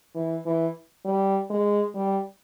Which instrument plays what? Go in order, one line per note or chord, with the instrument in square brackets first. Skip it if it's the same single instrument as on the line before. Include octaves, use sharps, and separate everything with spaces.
[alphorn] E3
E3
G3
G#3
G3